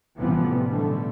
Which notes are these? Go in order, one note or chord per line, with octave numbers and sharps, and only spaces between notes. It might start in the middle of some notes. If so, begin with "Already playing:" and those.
A1 C3 E3 F3 G3 B3
B2 D3 G3 A3